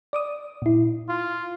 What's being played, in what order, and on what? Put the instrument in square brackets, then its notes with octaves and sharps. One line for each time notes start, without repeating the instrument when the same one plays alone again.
[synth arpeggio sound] D5 D6 D#6
A#2 E4
[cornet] F4